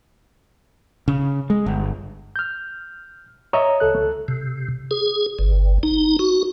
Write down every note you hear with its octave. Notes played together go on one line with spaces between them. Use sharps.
C#3
G#3
G1
F6 G6
C#5 D#5 E5 A#5
C#2 A4 F#6
C3
G#4
G1
D#4
F#4